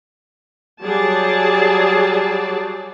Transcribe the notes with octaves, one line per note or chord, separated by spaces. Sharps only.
F#3 G3 G#4 D5 A5